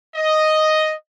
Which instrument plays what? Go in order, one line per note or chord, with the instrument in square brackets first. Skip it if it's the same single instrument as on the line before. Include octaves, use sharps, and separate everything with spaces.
[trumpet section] D#5